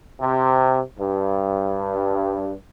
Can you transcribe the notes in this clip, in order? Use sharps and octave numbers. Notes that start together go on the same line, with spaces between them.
C3
G2